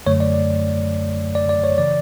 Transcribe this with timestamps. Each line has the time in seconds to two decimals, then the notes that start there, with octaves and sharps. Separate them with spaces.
0.06 F#2 D3 F#3 A3 C#5
0.20 D5
0.34 D5
1.35 D5
1.49 D5
1.64 C#5
1.78 C#3 E3 D5